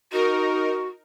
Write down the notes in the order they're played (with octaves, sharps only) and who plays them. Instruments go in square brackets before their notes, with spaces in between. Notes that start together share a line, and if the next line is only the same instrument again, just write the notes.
[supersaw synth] D#4 A#4 [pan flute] F#4